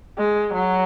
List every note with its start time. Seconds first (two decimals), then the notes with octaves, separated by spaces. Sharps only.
0.18 G#3
0.54 F#3